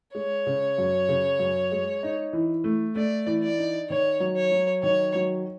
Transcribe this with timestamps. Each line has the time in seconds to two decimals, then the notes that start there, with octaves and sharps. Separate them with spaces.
0.15 G#3 C#5
0.46 C#3
0.78 F#2
1.09 C#3
1.39 F#2
1.72 G#3
2.03 D#4
2.33 E3
2.64 A3
2.95 A3 D5
3.26 E3
3.43 D5
3.58 D#4
3.90 D#3 C#5
4.20 F#3
4.36 C#5
4.52 F#3
4.83 D#3 C#5
5.15 F#3